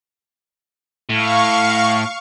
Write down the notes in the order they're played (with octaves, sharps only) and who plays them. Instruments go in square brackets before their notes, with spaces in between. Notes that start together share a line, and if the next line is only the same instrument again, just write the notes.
[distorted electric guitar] A2 [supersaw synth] F5 C#6